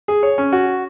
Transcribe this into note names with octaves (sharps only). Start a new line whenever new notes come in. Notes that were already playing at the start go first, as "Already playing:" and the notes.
G#4
C#5
C#4
F#4